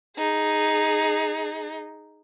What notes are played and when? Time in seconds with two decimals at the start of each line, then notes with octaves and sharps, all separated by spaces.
0.16 D#4 G#4